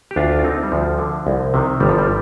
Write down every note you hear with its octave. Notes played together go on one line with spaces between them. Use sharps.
G4
D2 D4 F4
F4
D3 C4 D#4
G3
D2 F3
D3
C2
C3 D#3
G1 G3
F3
G3